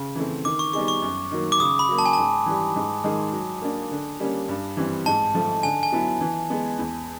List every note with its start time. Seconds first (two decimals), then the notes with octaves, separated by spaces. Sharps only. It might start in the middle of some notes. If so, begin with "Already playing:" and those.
Already playing: C#3
0.15 E3 A3 C4
0.45 D#3 D6
0.59 C#6
0.73 G3 B3 D#4 G#4 C#6
0.88 C#6
1.02 F#2
1.32 D#3 F#3 A#3
1.52 D6
1.60 C#3 D#6
1.79 B5
1.88 F#3 A#3
1.98 A5
2.06 G#5
2.13 G#2 A5
2.46 E3 G3
2.76 G#2
3.04 D#3 G#3
3.32 F#3
3.61 A#3 D4
3.91 D3
4.20 G3 A#3 C#4
4.48 G2
4.77 E3 G3 C4
5.06 G#2 A5
5.34 F3 A3
5.63 D3 G#5
5.83 G#5
5.92 F#3 B3 E4
6.21 E3
6.50 G#3 B3
6.79 E2